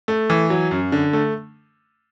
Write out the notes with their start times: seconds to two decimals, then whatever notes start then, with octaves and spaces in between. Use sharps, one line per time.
0.08 A3
0.30 E3
0.50 F#3
0.71 F#2
0.92 D3
1.13 A3